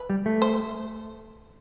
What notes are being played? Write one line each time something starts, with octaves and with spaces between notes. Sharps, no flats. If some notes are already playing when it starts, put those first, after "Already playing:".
Already playing: B4
G3
A3
C5